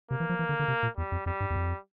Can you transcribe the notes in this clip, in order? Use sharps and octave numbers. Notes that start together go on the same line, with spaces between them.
C3 A#3
E3
F3
E3
D3
D3
C3
A#2
E2 G3
F2
F2 G3
G2
E2
F2